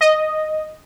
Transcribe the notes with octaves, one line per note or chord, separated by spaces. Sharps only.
D#5